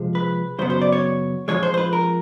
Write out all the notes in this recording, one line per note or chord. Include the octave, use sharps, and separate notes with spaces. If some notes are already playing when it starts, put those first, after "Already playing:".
Already playing: C3 F3 G#3
B4
F#2 C#3 F#3 B3 C5
C5
D5
C#5
F2 D3 F3 G#3 C#5
C5
C5
B4
A#4